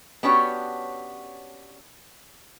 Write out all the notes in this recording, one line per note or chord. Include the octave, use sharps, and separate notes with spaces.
B3 C#4 D4 F#4 G4 C#5